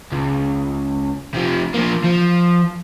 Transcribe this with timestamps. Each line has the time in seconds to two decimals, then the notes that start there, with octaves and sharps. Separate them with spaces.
0.12 C#2
1.34 C3 F3
1.74 F3 A#3
2.04 F3